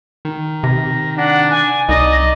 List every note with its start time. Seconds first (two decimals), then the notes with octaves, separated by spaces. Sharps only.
0.25 D#3
0.63 C3 A#6
1.18 D4 F#5
1.50 G#5
1.89 C2 D#4 D5 D#5 A#6